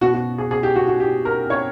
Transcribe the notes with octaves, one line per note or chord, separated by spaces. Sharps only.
B2 F#4
F#4
G#4
G#4
G4
F#4
F#4
G4
A#4
C#5